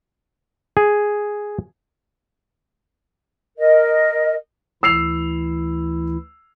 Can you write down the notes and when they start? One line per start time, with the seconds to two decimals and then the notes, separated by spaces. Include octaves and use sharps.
0.77 G#4
3.57 A#4 D#5
4.83 D2 E3 E4 E6 C7 F7